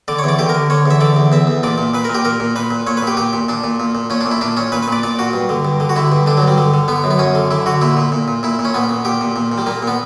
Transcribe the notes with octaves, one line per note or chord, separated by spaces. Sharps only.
D3 D5
C#5
E2 D5
D3 G4
A#4
D3
D3 C#5
E2 E5
D3 D5
E2
E2 E5
E2
A#2 D5
A#2
A#2 B4
A#4
A#2 G4
A#2 A#4
A#2
A#2 B4
A#2
A#2 C#5
B4
A#2 G4
A#2 G4
A#2
A#2 D4
A#2
A#2
A#2
A#2 C#4
D4
A#2
E4
A#2 D4
A#2 C#4
A#2 B4
B4
A#2 D5
A#2 D5
A#2 F#4
G2
D3
G2
D3
F#4
D3 E4
G2
D3 D4
F#3
G2
G3
D3
D3
D3 B3
F#2
B3
F#2 C#4
D3
D3 E4
D3 F#4
A#2 E4
A#2
A#2
A#2
A#2 E4
A#2
C#4
A#2 B3
A#2
A#2 G4
A#2
A#2
A#2
G3
A#2 A#3
A#2
B3